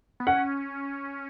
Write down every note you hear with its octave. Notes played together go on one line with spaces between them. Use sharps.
B3
C#4 F#5